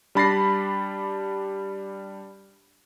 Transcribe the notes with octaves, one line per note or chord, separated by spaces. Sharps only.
G3 D4 B5 A6 A#6 C7